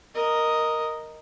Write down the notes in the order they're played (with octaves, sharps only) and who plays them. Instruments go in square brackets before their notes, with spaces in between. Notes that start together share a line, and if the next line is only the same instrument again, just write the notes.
[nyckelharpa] A#4 D#5